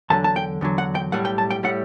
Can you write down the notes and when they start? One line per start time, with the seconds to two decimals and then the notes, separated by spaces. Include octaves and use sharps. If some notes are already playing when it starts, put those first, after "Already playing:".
0.10 E2 D3 F#3 A5
0.24 A5
0.36 G5
0.61 E2 D3 F#3
0.78 F#5
0.95 G5
1.12 B1 A2 G3 F#5
1.25 G5
1.38 A5
1.51 G5
1.63 A2 G3 F#5